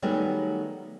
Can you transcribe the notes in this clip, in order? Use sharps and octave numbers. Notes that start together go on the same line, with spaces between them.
D#3 F#3 G3 A3 B3 G#4